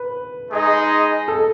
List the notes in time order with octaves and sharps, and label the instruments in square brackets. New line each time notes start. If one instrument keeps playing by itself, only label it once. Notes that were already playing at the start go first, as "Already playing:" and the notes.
Already playing: [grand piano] B4
[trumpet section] G#3 D#4 G#4 D#5
[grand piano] A4